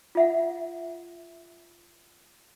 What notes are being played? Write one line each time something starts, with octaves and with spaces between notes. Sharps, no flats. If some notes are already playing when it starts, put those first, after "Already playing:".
F4 E5 F#5